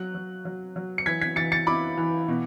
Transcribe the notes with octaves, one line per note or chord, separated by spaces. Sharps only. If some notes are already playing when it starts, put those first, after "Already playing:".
Already playing: F#3 F#6
F#3
F#3
F#3
C#7
E3 G#6 B6
G#6 B6
E3 A6 C#7
A6 C#7
E4 B5 D6
E3
B2